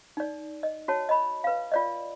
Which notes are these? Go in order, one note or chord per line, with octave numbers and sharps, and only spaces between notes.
D#4 D5
D#5
F#4 C#5 A5
D#5 B5
B4 F5
F4 D5 D#5